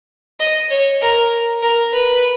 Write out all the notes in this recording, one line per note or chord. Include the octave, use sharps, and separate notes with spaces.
D#5
C#5
A#4
A#4
B4